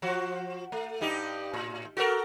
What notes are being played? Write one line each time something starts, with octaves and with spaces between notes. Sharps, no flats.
F3 F#4
A3
G2 D#4 G4
A2
F#4 A4 A#4